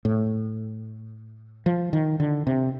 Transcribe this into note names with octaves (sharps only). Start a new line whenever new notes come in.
A2
F3
D#3
D3
C3